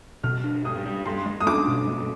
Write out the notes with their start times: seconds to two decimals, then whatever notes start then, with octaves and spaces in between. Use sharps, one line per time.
0.24 B2 F6
0.44 D4
0.64 G2 D#6
0.85 G2
1.05 G2 C6
1.26 G#3
1.40 D#6
1.47 D4 D6
1.67 B2
1.87 G#3